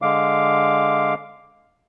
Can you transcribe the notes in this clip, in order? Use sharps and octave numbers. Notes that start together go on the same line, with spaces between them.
D3 G#3 F5 D6